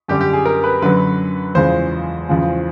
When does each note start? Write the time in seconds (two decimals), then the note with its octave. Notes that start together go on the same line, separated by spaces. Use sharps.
0.08 F#2 D3 G3 G4
0.21 G4
0.33 G#4
0.45 A#4
0.64 B4
0.82 F#2 D3 F#3 B4
1.55 E2 C#3 F3 G#3 C5
2.29 E2 C#3 F3 G#3